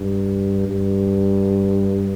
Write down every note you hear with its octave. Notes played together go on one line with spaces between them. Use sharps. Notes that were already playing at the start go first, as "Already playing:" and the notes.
Already playing: G2
G2